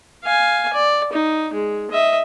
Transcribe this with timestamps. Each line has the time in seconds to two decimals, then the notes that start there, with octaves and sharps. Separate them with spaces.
0.23 F5 G#5
0.73 D5
1.13 D#4
1.53 G#3
1.91 D#5 E5